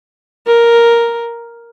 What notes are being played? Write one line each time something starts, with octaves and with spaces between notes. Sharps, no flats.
A#4